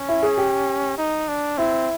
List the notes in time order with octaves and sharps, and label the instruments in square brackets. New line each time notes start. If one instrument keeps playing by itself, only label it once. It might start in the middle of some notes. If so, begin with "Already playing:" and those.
Already playing: [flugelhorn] C#4
[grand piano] E4
G#4
G4
[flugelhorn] D#4
D4
[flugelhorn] C4 [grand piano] E4